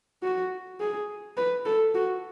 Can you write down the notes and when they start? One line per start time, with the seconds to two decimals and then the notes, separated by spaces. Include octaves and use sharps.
0.23 F#4
0.80 G#4
1.37 B4
1.65 A4
1.95 F#4